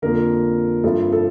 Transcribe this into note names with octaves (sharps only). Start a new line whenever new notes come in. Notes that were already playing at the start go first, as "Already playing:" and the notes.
F2 D3 F3 A#3 A#4
G2 F3 C4 E4 A4
A4